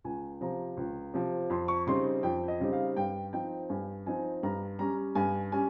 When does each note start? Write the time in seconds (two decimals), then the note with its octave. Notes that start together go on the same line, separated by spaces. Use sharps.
0.04 C#2 G#5
0.41 C3 F3 A#5
0.77 C#2
1.14 C3 F3
1.50 F2 C6
1.68 C#6
1.87 C#3 G3 C4 D#4 C6
2.23 F2 G5
2.48 D#5
2.60 C#3 G3 C4 D#4
2.73 F5
2.97 G2 G5
3.33 F3 C4 D#4 G5
3.69 G2 G#5
4.06 F3 C4 D#4 G#5
4.43 G2 A#5
4.79 G3 C#4 A#5
5.15 G2 G#5
5.52 G3 C#4 G#5